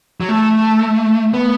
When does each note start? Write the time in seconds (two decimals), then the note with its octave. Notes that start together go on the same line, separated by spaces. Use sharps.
0.21 F#3
0.29 A3
1.34 B3